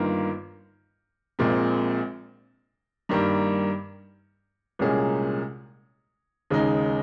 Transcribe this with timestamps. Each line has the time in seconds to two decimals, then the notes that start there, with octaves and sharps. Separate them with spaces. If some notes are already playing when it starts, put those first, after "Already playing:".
Already playing: G1 G2 D#3 A#3 F4
1.39 A#1 A#2 G#3 C4
3.09 G2 D#3 G3 A#3
4.79 C2 A#2 G#3 C#4 G#4
6.50 D#2 C#3 G#3 D#4